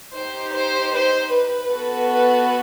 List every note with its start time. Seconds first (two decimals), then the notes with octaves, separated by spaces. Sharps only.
0.14 D#4 G4 C5
0.54 C5
0.94 C5
1.34 B4
1.72 B3 F#4 A4
2.12 B4